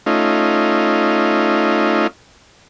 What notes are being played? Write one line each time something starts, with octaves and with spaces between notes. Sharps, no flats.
A3 C#4 D#4 F4